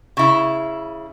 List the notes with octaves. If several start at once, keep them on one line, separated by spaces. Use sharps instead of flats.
C#3 E4